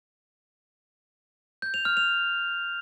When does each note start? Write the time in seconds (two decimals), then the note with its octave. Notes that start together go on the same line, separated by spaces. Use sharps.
1.62 G6
1.74 F7
1.85 F6
1.97 F7